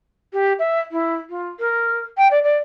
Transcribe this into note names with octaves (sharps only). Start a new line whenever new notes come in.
G4
E5
E4
F4
A#4
G5
D5
D5